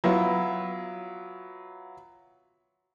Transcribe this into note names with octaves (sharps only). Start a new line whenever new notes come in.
F#3 B3 E4 F4